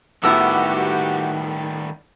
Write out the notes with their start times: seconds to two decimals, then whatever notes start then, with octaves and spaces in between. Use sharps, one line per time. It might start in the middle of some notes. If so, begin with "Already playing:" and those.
0.24 A2 D#3 G3 B3 E4 F#4 G4 E6